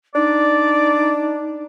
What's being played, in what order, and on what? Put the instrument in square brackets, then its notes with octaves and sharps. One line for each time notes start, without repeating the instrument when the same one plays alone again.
[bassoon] D4 [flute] D#4 [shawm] D5